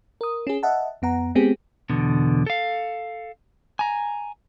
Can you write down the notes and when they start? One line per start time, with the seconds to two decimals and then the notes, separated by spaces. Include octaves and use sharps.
0.21 A#4 D#6
0.47 C#4 G#4
0.63 D#5 E5 F#5 A5
1.02 F2 B3 F#5 A#5
1.35 G#3 B3 C4 G4 G#4
1.89 E2 B2 D3
2.46 A4 F5
3.79 G#5 A#5